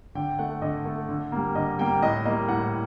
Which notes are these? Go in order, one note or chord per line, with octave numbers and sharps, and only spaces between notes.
D3 G5
A3 F#5
D3 D#5
A3
D3
G3 A#3
D3 D#5
G3 A#3 G5
A2 D#5
G3 A#3 D#5
A2 F#5